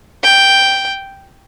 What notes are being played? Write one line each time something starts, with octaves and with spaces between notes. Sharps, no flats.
G5